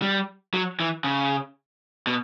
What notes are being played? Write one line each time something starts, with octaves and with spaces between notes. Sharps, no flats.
G3
F#3
E3
C#3
B2